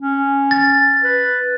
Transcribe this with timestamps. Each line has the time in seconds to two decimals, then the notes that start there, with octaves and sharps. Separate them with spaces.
0.01 C#4
0.51 A6
1.03 B4